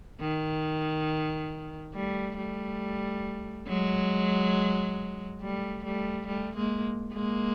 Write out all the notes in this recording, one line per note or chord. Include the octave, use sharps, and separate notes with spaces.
D#3
G3 A3
G3 A3
F#3 G#3
G3 A3
G3 A3
G3 A3
G#3 A#3
G#3 A#3